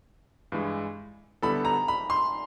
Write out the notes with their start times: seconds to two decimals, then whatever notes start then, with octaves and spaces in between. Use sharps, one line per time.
0.52 G2 E3 G#3
1.42 D3 G3 B3 E4 A4 B5
1.65 A#5
1.88 B5
2.10 C6